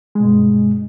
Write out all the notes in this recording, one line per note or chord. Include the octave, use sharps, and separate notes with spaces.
G2 B2 G#3